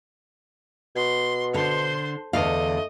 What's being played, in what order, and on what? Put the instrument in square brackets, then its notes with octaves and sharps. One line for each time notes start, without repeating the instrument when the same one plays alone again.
[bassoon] B2 [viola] C6
[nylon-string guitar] D3 [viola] C5 C6
[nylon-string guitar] E2 D3 F5 [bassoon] A3 [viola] D#5